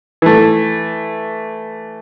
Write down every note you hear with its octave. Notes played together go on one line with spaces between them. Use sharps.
E3 A3